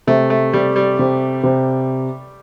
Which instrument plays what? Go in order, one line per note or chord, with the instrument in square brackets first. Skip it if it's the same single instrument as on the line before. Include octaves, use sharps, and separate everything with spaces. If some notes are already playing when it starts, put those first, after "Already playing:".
[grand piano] C3 [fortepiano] A3
[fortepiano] A3
[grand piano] C3 [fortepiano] G3
[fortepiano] G3
[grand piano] C3
C3